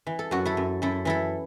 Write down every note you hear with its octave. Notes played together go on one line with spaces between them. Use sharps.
E3
A4
F#2 F#4
E4 A4
F#2
F#2 E4 A4
E3 E4 A4